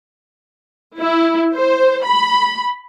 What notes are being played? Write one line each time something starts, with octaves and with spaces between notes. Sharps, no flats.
E4
C5
B5